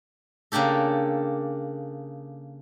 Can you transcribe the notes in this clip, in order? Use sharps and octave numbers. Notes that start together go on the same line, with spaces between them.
C#3 A#3 D4 G4 A4